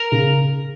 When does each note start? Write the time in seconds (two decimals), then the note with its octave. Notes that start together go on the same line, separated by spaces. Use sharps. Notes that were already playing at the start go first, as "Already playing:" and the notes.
Already playing: A#4
0.12 C#3